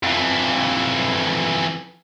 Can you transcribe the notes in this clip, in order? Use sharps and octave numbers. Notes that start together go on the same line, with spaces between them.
F2 E3